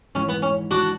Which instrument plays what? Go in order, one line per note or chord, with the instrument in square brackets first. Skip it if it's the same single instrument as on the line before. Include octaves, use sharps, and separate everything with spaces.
[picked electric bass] G#1 G#2 E3 [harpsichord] C#4
[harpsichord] B3
C#4
D4 F#4